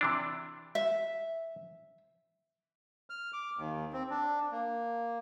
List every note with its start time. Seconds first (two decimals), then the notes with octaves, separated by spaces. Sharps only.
0.01 C3 E3 D4
0.75 E5
3.10 F6
3.33 D6
3.57 D#2
3.93 C4
4.10 D4
4.51 A#3